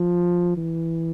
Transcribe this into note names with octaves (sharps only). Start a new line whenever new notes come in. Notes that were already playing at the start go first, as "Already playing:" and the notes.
Already playing: F3
E3